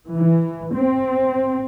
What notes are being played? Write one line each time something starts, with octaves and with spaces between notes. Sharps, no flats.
E3
C4